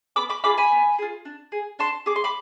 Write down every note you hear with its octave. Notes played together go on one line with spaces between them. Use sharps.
B3 B5 D6
B5 D6
F4 G#4 B5 D6
G#5 B5
B3
F4 G#4
D4
G#4
D4 A5 C6
G#4 D6
C6
B5 D6